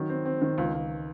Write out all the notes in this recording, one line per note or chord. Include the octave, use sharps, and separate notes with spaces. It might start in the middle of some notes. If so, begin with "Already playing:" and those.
Already playing: D#3 F#3
C4
C4
D#3
C#2
C#2